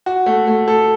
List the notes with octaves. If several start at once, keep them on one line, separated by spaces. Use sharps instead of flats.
F#4
A3
A3
A4